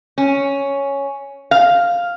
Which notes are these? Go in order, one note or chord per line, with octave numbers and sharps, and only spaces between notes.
C#4
F5